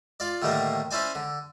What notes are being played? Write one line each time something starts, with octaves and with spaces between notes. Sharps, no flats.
F4 D5
A2 D3 D#3 G3 A3 A#3
C#4 E4 C5 D5 G#5
D3